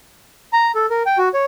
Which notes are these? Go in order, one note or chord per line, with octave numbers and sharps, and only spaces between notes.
A#5
A4
A#4
G5
F#4
C#5